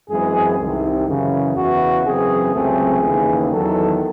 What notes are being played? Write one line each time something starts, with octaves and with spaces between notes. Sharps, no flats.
F#2 E3 G#3 C4 G#4
C2 C3 D#3
F#2 C#3 E3
E2 C#3 E3 F#4
F#2 C#3 E3 C4 G#4
C#2 C3 F#3 A3 C4 G#4
D#2 C#3 E3
E2 D#3 F#3 A4